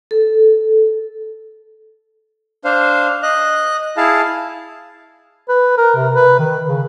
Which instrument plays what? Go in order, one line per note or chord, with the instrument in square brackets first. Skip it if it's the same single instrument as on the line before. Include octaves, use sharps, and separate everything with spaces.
[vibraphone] A4
[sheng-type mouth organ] D4 C5 F5
D#5 F#6
E4 G#4 F5 A5
[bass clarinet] B4
A#4
C3
B4
D#3
C#3